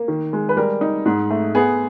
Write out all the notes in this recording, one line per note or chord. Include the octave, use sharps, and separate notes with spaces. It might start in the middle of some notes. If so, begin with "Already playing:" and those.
Already playing: A#3
D#3
G#3
B4
G3 A#4
D#4
G#2
A3
B3 G#4